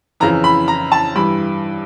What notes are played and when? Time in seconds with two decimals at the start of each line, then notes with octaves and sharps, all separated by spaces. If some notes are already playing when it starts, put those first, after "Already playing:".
0.20 F2 C#3 E3 A#5
0.44 B5
0.68 A#5
0.92 A5
1.15 G2 E3 B5